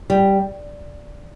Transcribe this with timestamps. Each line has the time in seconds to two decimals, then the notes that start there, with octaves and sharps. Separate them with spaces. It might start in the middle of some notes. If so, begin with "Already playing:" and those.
0.10 G3